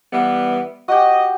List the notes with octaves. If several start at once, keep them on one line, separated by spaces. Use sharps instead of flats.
E3 G3 B3
F#4 G4 D#5